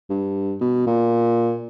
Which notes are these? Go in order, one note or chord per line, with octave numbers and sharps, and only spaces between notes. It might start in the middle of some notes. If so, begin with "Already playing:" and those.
G2
B2
A#2